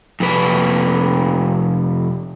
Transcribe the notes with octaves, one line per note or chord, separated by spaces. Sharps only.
F2 C3 B4